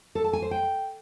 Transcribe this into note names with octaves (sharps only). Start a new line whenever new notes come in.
A4
A5
G#5
C5
G5